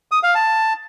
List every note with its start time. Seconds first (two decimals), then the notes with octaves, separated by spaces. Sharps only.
0.12 D#6
0.23 F5
0.35 A5